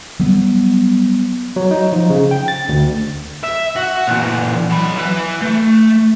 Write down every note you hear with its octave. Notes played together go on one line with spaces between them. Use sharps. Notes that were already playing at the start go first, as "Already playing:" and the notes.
F#3 G3 B3
F#3
D#4
F3
C#3
G5
A6
D2
E5
F#4
A#2 E3
F#3 B5
E4 B4
A3